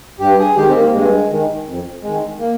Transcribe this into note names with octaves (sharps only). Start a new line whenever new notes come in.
G2 G4
G#4
D#3 G#3 G4
C4
A#3
G2 G#3
D#3 G#3
F2
D#3 G#3
A#3